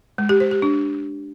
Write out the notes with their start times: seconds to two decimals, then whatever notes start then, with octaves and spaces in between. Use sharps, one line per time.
0.18 G#3
0.29 G4
0.40 C5
0.51 G4
0.62 D4